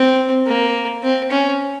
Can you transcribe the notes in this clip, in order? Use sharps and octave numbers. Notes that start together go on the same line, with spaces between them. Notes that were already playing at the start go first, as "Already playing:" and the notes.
Already playing: C4
A#3
C4
C#4